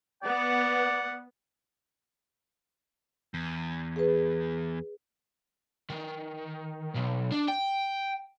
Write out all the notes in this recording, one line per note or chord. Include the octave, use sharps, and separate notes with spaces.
B3 D5 F#5
E2
G#4 B4
D#3
B1
D4
G5